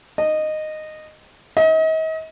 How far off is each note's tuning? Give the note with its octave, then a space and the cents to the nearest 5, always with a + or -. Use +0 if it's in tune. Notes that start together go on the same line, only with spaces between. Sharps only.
D#5 -10
D#5 +40